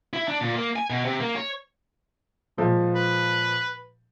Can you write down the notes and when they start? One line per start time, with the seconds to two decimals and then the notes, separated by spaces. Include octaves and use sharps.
0.13 E4
0.28 D4
0.41 A#2
0.56 A#3
0.76 G#5
0.90 B2
1.05 C3
1.21 A#3
1.36 C#5
2.57 A#2 F3 G#3
2.94 B4